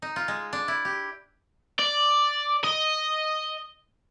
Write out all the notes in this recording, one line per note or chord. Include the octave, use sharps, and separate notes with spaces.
D#4
F4
G#3
D4
E4
G4
D5
D#5